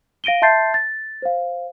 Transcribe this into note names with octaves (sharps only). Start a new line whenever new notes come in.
F5 A#6 D7 D#7 G7
E5 A5 C6 G6 A6 C7
A6
C5 F5